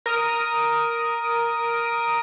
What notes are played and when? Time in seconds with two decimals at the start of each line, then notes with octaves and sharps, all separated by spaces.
0.06 A#4 D#6 D7